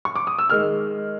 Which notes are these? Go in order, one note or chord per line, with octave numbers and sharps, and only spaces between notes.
C#6
D6
D#6
E6
D#3 G#3 F6